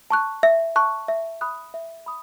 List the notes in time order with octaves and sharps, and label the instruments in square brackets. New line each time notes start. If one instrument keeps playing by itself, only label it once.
[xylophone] A5 C#6 F#6
E5
A5 C#6 F#6
E5
B5 D#6 F#6
E5
B5 D#6